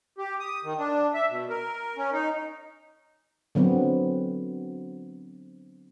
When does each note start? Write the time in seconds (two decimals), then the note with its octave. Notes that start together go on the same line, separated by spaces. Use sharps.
0.18 G4
0.40 D#6
0.64 D#3
0.79 D4
1.14 E5
1.30 B2
1.50 A#4
1.97 C#4
2.12 D#4
3.55 D3 F#3 B3 C4